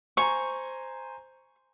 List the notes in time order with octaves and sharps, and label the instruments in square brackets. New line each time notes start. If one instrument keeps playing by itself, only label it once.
[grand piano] C5 G#5 A#5 [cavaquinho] C#6